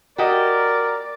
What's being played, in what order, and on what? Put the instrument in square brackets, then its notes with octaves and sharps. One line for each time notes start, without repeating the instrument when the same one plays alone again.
[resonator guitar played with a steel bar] F#4 G4 D#5 [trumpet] A#4 [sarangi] D5